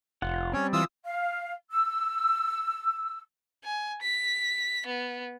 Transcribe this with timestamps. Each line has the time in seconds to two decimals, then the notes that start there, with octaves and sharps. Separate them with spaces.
0.22 F1 F4 F#5
0.53 G3 C4 C#4 C#5
0.73 E3 F4 D#6 E6
1.04 F5
1.71 E6
3.64 G#5
4.02 B6
4.87 B3